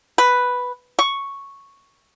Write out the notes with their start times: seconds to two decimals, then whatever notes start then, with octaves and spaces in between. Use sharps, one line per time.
0.18 B4
0.99 C#6